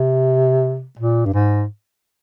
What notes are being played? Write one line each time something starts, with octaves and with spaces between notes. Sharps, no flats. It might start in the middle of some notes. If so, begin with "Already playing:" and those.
Already playing: C3
A#2
G2
G#2